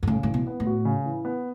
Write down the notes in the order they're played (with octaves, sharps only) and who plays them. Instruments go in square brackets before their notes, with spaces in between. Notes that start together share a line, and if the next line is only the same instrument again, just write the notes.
[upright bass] G2
[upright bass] A2 [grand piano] C#3
[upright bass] A2 [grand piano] E3
[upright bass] B2
[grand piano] B3
[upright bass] A2
[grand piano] F#4
C#3
E3
B3